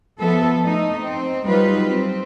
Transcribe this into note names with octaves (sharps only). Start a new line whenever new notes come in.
F3 B3 A4 E5
A3 D#4
C4
F#3 G3 D#4 F4 B4
C4